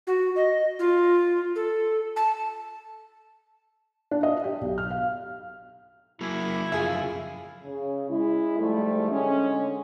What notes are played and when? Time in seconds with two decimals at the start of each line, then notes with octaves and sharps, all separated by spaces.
0.07 F#4
0.36 D#5
0.79 F4
1.56 A4
2.16 A5
4.11 D4
4.23 D#5
4.44 G4
4.61 B1
4.78 F6
4.91 F5
6.21 F#3 A#3 E4
6.72 F#2 C#3 F3 F4 G#4 E5
7.64 C#3
8.10 G#3 E4
8.58 G#2 F3 G3 A3
9.10 D3 G#3 C#4